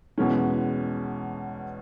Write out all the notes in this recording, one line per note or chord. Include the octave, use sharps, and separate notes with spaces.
E2 B2 G#3 C#4